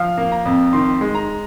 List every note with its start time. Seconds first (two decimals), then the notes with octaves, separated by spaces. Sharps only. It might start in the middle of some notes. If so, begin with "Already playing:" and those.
Already playing: F3 F5
0.18 A#3
0.32 A#5
0.45 F2
0.73 D#3 C6
1.01 G#3
1.15 A#5